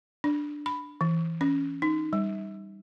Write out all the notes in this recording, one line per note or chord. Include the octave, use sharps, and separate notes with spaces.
D4
B5
E3
C#4
D#4
G3